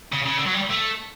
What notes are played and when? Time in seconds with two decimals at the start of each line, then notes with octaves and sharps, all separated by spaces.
0.13 C#3
0.26 C#3
0.37 D3
0.47 F#3
0.54 G3
0.70 A3